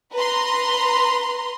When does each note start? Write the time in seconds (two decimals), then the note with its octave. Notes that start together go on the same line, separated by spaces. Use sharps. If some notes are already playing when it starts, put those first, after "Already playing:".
0.14 B4 A#5 C6